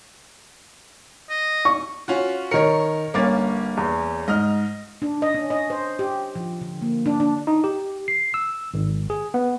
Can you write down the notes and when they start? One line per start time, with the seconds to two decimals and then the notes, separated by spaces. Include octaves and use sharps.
1.30 D#5
1.65 C#6
2.08 C#4 F4 F#4
2.51 D#3 A#4 C#5 C#7
3.14 G1 A#3 C#4 D6 A6
3.77 E2
4.28 G#2 D#5 F6
5.02 D4
5.22 D#5
5.34 C#4
5.50 D#5
5.70 C5
5.99 G4
6.35 F3
6.61 D3
6.82 A#3
7.06 D4
7.20 D4
7.47 D#4
7.64 G4
8.08 C7
8.34 E6
8.74 G#1
9.10 G#4
9.34 B3